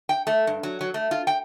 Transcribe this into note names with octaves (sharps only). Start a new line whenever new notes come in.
G5
A3
G2
F#3
F#3
A3
F4
G5